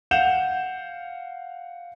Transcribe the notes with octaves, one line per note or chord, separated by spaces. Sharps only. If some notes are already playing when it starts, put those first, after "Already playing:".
F5 F#5 G6 E7 F7